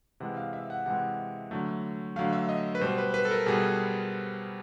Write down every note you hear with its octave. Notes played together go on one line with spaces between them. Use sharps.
C3 E3 G#3 F#5
F5
E5
F#5
C3 E3 G#3 F#5
D3 F#3 A3
D3 F#3 A3 F5
E5
D#5
B4
B2 G3 C5
B4
B4
A4
A#4
B2 G3 G#4